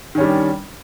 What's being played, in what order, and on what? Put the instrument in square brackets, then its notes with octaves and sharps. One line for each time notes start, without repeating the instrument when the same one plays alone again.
[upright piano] D#3
C#4
G3
D4